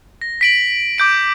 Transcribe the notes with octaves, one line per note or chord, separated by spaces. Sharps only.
A#6
B6 D7 F#7
D6 G6 D7